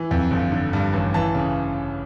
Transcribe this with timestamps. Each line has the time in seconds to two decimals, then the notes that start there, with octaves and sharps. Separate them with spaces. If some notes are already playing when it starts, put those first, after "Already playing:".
Already playing: E3
0.11 F2
0.31 G1
0.52 D3
0.73 G2
0.93 A1
1.14 E3 A5
1.35 C#3